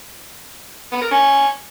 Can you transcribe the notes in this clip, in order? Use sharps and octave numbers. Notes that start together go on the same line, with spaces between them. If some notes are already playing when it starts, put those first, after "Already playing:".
B3
A#4
C#4